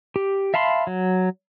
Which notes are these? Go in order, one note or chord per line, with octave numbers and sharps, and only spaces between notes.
G4
E5 F5 A5 B5 C6
F#3